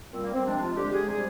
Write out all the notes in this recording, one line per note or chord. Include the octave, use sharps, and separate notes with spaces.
A#2 G3 C4
A#3
C4
C3 F3 G#3 D4
F4
D3 G#3 G4
G#4
C3 G3 G#4